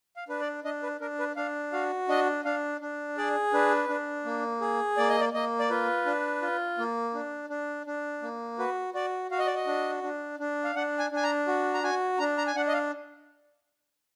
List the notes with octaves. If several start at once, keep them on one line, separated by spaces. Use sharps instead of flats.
F5
D4 B4
D5
D4 D#5
B4
D4 A#4
B4
D4 F5
F#4 F5
D4 D#5
D4 F5
D4
G#4 D5
D4 B4
D4
A#3
G#4
A#3 D5
D#5
D5
A#3 D#5
D5
F4 B4
D4
F4
A#3
D4
D4
D4
A#3
F#4 B4
F#4 D5
F#4 F5
D#5
D5
D#5
D4
D4
D4
F5
D4 F#5
G#5
D4 G#5
A#5
F#4
A#5
F#4 G#5
D4 A#5
A#5
G#5
D4 F#5
D#5
F5